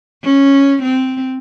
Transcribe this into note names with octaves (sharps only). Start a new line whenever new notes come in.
C#4
C4